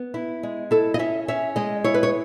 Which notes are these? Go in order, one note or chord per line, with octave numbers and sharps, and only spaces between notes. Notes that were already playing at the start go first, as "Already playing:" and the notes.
Already playing: B3
E4
G#3
E4 A4
D#5
C#4 E5
C#4 E5
G#3 D#5
E4 C#5
B4
C#5